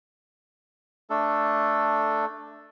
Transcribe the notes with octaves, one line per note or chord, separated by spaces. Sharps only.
A3 D4 A4